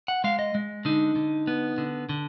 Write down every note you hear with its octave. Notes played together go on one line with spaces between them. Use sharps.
F#5
G#3 F5
D#5
G#3
D3 D#4
D3
B3
D3
D3